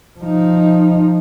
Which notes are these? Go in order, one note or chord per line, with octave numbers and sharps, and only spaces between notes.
F3 D#4